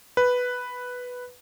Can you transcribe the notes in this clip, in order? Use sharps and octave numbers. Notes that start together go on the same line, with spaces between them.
B4